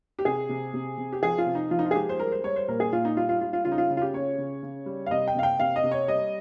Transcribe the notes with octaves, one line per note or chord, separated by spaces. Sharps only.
G4
C3 G#4
C3
C3
C3
G4
F3 G#4
F4
C3
D#4
F3 F4
D#4
F4
G#4
G#3 G4
C5
G3 A#4
C5
G3 C#5
C5
A#2 A#4
G#4
A#2 F4
D#4
G3 F4
F4
G3 F4
F4
C#3 F4
D#4
F4
C#3
F4
G4
C#3 C#5
C#3
C#3
G3
F5
C3 D#5
G5
C3 F5
G5
C3 F5
D#5
C3
C#5
G3 D#5